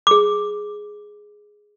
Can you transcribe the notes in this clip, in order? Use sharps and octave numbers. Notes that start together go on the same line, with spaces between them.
G#4 D6